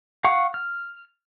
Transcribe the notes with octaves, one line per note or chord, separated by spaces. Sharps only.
F5 F#5 C#6
F6